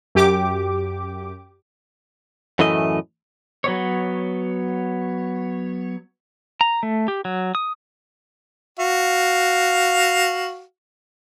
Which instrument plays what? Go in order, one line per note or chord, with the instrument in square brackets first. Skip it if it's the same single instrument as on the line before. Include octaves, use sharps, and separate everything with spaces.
[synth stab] F#2 G4 D6
[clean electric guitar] F#2 A2 E3 A3 D#5
[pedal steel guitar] F#3 B3 C#5
A#5
A3
G4
F#3
D#6
[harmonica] F#4 F5